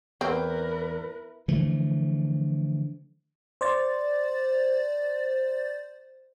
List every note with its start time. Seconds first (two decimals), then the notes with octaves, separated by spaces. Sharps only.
0.21 E2 C4 A#4 B4
1.48 D3 E3 F3 A3
3.61 C5 D5 A6